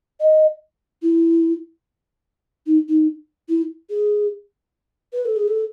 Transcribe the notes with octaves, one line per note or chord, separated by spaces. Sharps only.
D#5
E4
D#4
D#4
E4
G#4
B4
A4
G#4
A4